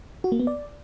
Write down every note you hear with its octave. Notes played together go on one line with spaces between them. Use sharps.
F#4
A#3
B3
D5